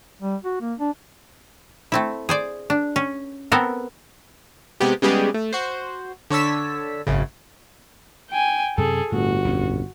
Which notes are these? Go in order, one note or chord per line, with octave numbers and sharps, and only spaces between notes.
G3
F#4
A#3
D4
A3 C4 E4
G#4 C5 D5
D4
C#4
B3 C4 A4 A#4
C3 G#3 B3 G4
C#3 G3 G#3 B3 G4 G#4
A3
F#4 C5
D3 C#5 A5 E6 B6
G#1 F#2 C#3
G5 G#5
F#2 C3 G#4 A4
G1 A2 F#4
A#1 F2 C#4